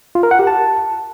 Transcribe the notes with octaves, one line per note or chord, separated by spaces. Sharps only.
F4
A#4
F#5
G4
A5